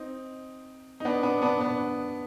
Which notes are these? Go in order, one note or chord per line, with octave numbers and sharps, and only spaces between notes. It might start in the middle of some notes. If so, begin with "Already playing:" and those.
Already playing: C4 D#4
D#4
B3 D4
B3 D4
B3 D4
B3 D4